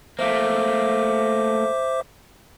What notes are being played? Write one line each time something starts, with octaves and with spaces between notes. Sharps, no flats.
A3 A#3 C5 E5 D6